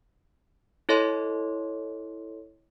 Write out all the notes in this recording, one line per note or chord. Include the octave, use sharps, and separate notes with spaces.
E4 A4 C#5 D#5 C6